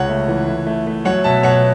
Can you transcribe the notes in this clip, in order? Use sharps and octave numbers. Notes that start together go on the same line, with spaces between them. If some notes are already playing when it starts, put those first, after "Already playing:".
Already playing: C#2 C#5 F#5
A3
E3
A3
A3
A3
F#3 C#5 F#5
B2 E5 A5
B2 C#5 F#5